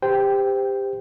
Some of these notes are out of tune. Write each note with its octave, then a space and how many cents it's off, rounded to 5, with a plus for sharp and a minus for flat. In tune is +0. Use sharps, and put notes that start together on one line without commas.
G4 +20 C5 -20 G5 +0